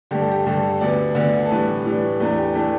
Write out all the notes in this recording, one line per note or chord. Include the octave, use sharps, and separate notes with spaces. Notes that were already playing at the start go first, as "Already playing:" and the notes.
G2 D3 A3 G4
A4
G4
G2 D3 A3 A4
D2 D3 B3 D5
D2 D3 B3
A4
A2 E3 G3 D4 B4
A2 E3 G3 D4
E2 E3 A3 D4 B4
G4
E3 A3 D4 G4